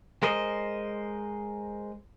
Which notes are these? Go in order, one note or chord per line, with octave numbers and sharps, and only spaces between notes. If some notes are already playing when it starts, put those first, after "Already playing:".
G#3 A#4 C5 D#5